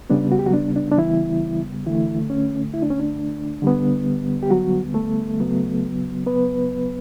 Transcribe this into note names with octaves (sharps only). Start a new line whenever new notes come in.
C#3 G3 B3 D4
F#4
G4
F#3 F#4
D4
D4
D4
E3 E4
D3 E3 A3 E4
C#4
E4
D4
C#4
D4
D3 G3 B3
G4
F#3 F#4
A3 A4
C#3 F#3 B3
B3 B4